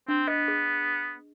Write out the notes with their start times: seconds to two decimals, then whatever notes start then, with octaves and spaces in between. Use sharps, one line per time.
0.08 C4 D4
0.28 B3 D#5
0.48 G#4